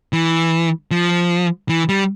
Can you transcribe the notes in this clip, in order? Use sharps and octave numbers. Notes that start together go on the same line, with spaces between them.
E3
F3
E3
G3